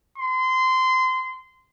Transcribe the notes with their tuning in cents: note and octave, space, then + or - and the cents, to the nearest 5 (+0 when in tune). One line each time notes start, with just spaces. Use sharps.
C6 -20